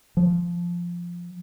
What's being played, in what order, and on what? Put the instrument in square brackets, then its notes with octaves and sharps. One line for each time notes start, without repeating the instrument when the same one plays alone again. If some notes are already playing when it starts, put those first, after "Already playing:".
[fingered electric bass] F3